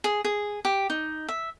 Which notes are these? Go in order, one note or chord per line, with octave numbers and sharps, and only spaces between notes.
G#4
G#4
G4
D#4
E5